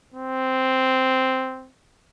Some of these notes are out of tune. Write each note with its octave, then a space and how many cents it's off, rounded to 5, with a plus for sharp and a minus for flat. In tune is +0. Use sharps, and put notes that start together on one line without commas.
C4 -5